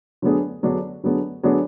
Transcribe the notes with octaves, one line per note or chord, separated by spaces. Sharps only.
D3 F#3 B3 D4 G#4
D3 F#3 B3 D4 G#4
D3 F#3 B3 D4 G#4
D3 F#3 B3 D4 G#4